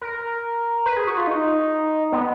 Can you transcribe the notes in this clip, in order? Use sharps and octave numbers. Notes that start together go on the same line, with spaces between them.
A#4
B4
G#4
F#4
F4
D#4
B3